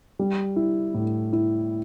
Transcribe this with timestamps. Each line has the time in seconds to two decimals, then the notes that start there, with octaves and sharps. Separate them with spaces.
0.19 G3
0.56 E4
0.94 A2
1.33 E4